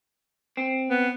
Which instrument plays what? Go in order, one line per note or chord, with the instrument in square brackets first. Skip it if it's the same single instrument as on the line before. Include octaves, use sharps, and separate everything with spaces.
[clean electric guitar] C4
[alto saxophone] B3